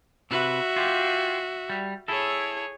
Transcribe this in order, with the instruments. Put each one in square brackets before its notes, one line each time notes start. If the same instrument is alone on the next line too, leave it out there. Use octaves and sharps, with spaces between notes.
[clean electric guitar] C3 B4 [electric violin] F#4 E5
[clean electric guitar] F4 G4
G3
[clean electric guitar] E4 A4 [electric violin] G#4 C#5